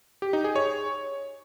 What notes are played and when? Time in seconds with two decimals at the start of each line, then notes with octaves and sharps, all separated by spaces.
0.22 G4
0.33 D#4
0.44 G#4
0.56 C#5